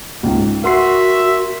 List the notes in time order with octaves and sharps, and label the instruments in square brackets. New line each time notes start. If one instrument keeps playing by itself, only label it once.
[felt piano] C#2 G#2
[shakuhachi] F#4 [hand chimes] A#4 C6 C7 [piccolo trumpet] E5 [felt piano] F#5